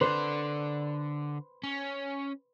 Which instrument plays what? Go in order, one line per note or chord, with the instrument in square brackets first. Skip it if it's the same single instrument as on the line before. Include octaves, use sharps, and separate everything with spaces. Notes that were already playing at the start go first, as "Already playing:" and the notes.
[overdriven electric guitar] D3 D5 [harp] B4 C5
[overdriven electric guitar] C#4